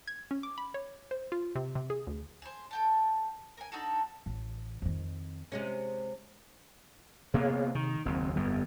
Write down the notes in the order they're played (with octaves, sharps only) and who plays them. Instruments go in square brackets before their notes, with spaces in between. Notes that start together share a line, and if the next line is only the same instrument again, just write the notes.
[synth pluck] G#6
C#4
D6
B5
C#5
C5
F4
C3
C3
G#4
D2
[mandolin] G#4 C5
A4 G5 A5
A#4 G#5
D4 D#4 F#4 A4
[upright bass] A1
F2 D#3
[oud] C3 G#3 C#4
[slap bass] C3 A#3 B3 [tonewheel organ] G#4 C#5 F5
[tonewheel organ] C3 [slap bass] D#3
[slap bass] F#1 D#2 [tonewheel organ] C4
[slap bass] G1 F2 [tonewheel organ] G3 B3